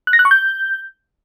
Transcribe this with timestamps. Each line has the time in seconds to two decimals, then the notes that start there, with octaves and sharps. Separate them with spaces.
0.07 F#6
0.13 A#6
0.19 F#6
0.25 C#6
0.31 G6